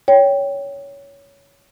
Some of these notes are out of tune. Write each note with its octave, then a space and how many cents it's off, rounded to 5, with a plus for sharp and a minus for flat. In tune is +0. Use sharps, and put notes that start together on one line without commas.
C#5 +15 G5 +0